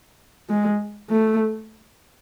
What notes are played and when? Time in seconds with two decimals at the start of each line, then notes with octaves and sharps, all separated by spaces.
0.49 G#3
1.09 A3